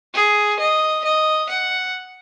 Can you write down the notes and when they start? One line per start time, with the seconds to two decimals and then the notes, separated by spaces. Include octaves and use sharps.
0.14 G#4
0.59 D#5
1.04 D#5
1.49 F#5